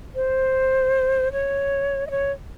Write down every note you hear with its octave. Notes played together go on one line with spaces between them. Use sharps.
C5
C#5
D#5
C#5